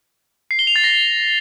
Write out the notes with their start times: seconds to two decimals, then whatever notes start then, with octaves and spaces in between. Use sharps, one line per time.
0.51 C7
0.59 G7
0.67 F7
0.76 A6
0.84 A#6